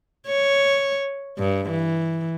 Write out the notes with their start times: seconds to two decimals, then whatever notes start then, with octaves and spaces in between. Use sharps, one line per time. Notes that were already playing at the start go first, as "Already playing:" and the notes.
0.27 C#5
1.38 G2
1.70 E3